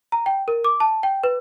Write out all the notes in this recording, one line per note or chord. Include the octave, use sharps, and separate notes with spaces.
A#5
G5
A#4
D6
A5
G5
B4